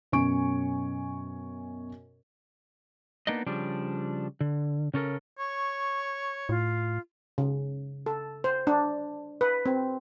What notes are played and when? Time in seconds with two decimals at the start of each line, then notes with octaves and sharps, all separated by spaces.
0.12 F#2 B2 C#4 G#5 C#6 D7
3.27 A#3 B3 D4 D#4 D#5
3.46 C#3 F3 G3 D4
4.41 D3
4.94 C#3 C#4 A4 A#4
5.39 C#5 C#6
6.49 A2 F4
7.38 C#3
8.06 A4
8.44 C5
8.67 D4
9.41 B4
9.66 C4